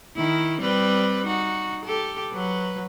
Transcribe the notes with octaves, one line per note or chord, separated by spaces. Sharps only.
D#3 E4
G3 C4 B4
D#4 F#4
G4 A4
F#3 B4